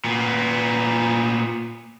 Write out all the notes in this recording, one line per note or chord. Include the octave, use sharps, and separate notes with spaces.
A#2 B3